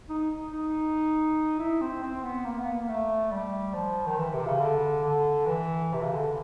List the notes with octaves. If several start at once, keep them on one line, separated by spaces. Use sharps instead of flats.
D#4
D#4
E4
C4
C4
B3
A#3
B3
A#3
A3
G3
F3
D#3
E3
C3
C#3
D3
D3
E3
C3
C#3
D3